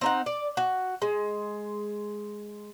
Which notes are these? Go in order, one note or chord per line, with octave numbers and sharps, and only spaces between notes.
C4 D#4 F#5
D5
F#4
G#3